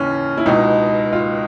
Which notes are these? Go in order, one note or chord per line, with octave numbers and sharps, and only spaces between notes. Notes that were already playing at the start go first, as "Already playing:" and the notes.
Already playing: D#2 C#3 E3 C#4
E4
C#2 B2 D#4
F4